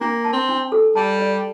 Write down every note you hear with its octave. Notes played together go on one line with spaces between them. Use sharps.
A#3 D4
A5
C4
D4
A4
G3 A5
D5